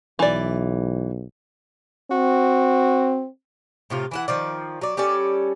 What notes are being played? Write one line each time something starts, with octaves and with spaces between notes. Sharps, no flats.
B1 E3 D5
C4 F#4
A2 C3 F4
E3 E4 F#5
D#3 F3 D5
F#3 D5
G3 C#4 A4 D5